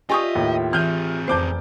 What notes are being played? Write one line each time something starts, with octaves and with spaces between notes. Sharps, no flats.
F4 G4 D#5 E5 G#5 C#6 D#6
D#2 A2
E3 C4 G#4 F6 G6
F1 F2 C5 D6 G6